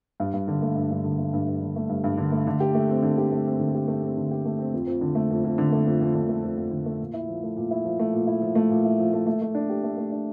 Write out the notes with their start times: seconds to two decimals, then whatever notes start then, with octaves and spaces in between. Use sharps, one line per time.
0.20 G2
0.33 G2
0.48 D3
0.62 A3
0.76 G2
0.91 G2
1.04 D3
1.19 A3
1.33 G2
1.48 G2
1.61 D3
1.76 A3
1.89 G2
2.04 G2
2.17 D3
2.32 A3
2.47 D3
2.60 G4
2.75 A3
2.89 C4
3.02 D3
3.18 G4
3.32 A3
3.46 C4
3.60 D3
3.75 G4
3.88 A3
4.02 C4
4.17 D3
4.31 G4
4.45 A3
4.59 C4
4.73 F2
4.87 F2
5.01 D3
5.15 A3
5.31 F2
5.45 F2
5.58 D3
5.72 A3
5.86 F2
6.01 F2
6.14 D3
6.29 A3
6.43 F2
6.57 F2
6.71 D3
6.86 A3
6.99 A#2
7.14 E4
7.29 F3
7.43 A3
7.56 A#2
7.71 E4
7.85 F3
7.99 A3
8.13 A#2
8.27 E4
8.42 F3
8.55 A3
8.70 A#2
8.85 E4
8.99 F3
9.13 A3
9.27 A3
9.42 A3
9.55 D4
9.69 G4
9.84 A3
9.97 A3
10.11 D4